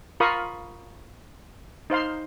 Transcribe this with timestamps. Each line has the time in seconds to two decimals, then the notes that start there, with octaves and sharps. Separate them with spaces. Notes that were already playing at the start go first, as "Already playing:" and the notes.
0.20 F4 A#4 F5 B5 C#6 D#6
1.90 D#4 C5 F5 C6